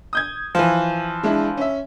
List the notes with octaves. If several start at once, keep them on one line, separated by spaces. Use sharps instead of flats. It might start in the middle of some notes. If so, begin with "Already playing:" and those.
D#6 G6 G#6
E3 F3
G#3 D4 E4
C#4 E5